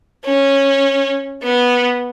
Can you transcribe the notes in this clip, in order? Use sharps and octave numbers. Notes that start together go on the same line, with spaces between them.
C#4
B3